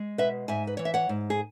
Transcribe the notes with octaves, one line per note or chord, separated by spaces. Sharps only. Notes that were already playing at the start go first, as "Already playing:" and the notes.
Already playing: G#3
B2 B4 E5
G#2 E5 G#5
B4
E3 C#5
E5
C#5 F#5
G#2
G#4